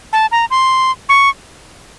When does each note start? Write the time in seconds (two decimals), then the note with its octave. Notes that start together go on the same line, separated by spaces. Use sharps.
0.13 A5
0.32 A#5
0.51 C6
1.09 C#6